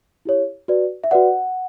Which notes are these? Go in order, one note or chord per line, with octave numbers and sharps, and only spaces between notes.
E4 G4 C#5
F#4 B4 D5
E5
F#4 B4 D5 F#5